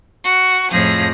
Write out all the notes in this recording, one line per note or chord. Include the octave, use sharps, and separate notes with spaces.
F#4
F2 A2 F3 G#4 A#6